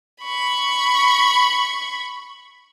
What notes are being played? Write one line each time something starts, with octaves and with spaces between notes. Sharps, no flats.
B5 C#6